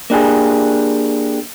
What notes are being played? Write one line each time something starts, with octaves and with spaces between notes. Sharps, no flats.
A#3 D4 G4 G#4